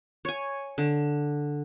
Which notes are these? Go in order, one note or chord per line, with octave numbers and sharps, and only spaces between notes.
C#5 G#5
D3